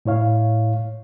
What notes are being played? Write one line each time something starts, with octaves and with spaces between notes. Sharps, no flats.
A2 E4 C#5 F5